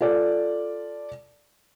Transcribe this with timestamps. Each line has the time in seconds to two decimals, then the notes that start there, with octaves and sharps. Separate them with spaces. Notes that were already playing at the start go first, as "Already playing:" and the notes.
0.01 F4 A4 D5